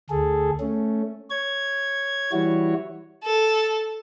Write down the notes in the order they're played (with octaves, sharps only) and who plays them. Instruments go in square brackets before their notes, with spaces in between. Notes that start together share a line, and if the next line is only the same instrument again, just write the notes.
[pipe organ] D2 G#4 A4
A3 C#4
C#5 G#6
E3 G3 E4 F#4 C#5
[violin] A4